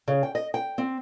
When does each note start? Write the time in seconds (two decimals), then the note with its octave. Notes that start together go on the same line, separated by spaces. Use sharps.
0.08 C#3
0.23 G5
0.35 D#5
0.54 G5
0.78 C4